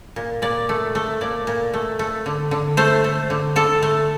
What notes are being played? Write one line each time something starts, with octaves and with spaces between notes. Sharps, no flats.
A#2
A#2 D5
A3
A3
A#2 D5
A#2
A3
A3
D3
D3
A3 C5
A3
D3
D3 A4
A3